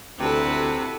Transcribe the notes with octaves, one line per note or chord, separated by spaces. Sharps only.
D2 C3 E4 F#4 G4 A4 B4